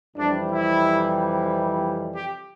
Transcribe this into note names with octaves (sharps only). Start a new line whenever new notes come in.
F2 C3 E3 G3 D4
E4
G4